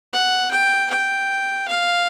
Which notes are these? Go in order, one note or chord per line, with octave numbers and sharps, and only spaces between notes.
F#5
G5
G5
F5